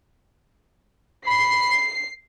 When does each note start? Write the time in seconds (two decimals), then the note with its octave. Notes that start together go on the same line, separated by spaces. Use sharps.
1.27 B5 C7